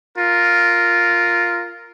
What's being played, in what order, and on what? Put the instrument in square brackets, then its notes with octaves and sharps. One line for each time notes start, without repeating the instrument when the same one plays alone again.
[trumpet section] F4 A#4